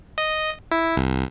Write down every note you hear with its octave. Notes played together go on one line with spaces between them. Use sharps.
D#5
E4
C2